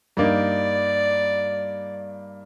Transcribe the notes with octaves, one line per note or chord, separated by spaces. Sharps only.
G2 A#3 D#4 D5